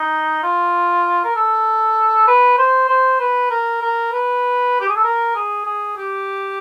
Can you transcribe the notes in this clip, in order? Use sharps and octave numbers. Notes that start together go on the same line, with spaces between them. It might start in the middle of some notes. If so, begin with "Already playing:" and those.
Already playing: D#4
F4
A#4
A4
B4
C5
C5
B4
A#4
A#4
B4
G4
G#4
A4
A#4
G#4
G#4
G4